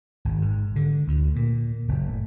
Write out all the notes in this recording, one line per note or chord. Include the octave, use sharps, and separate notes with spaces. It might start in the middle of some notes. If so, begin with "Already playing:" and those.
G#1
G#2
D3
D2
A#2
F#1
A2